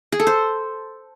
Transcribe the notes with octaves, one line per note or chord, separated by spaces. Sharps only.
G#4
A4
C5